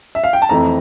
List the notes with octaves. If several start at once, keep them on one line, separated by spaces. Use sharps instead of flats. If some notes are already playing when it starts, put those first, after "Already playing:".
E5
F5
G5
A5
F2 E3 A3 C4 A#5